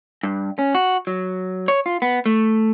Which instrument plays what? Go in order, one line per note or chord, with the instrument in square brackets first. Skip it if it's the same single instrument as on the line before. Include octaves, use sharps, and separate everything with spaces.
[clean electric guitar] G2
C#4
F#4
F#3
C#5
F4
B3
A3